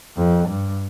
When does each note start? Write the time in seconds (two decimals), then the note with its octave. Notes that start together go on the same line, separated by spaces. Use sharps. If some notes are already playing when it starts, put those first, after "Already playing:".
0.17 F2
0.48 G2